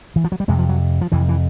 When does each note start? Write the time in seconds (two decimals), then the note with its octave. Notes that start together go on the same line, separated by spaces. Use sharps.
0.16 E3
0.24 F3
0.32 F#3
0.40 G3
0.48 F2 C3 G#3
0.59 F3
0.69 F#3
1.01 F3
1.12 F2 C3 E3
1.29 E3